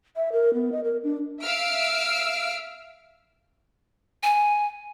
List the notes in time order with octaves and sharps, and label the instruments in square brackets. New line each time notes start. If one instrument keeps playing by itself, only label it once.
[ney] E5
A#4
B3
D#5
A#4
D4
[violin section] E5 F5 E6 F6 D7
[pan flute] G#5